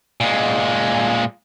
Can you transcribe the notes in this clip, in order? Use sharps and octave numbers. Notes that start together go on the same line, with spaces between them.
A#2 G#3